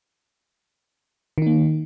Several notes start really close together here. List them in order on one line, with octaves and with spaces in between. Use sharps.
D#3 D#4 A#3